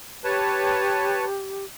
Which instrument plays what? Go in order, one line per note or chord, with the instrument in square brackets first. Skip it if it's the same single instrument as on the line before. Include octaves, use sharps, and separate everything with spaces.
[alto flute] G4 [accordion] B4 C#5 A5